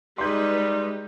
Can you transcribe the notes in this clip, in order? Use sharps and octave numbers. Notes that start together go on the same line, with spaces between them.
G3 G#3 D#4 B4 C6 G6